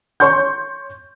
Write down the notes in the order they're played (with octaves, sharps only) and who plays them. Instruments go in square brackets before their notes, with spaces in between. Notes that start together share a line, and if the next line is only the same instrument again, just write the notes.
[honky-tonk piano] C#5 C6 C#6 G6